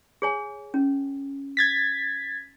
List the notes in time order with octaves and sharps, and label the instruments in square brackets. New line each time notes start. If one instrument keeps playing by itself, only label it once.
[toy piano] G#4 C#5 G#5
C#4
[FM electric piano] G#6 A6 B6